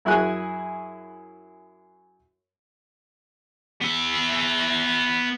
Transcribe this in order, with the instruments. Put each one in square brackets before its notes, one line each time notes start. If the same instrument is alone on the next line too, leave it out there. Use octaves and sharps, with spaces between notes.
[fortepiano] F#2 E4 F#4 G#4 G#5 F#6
[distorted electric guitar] B3 E5